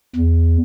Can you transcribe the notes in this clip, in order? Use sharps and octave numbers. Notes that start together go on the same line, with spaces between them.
E2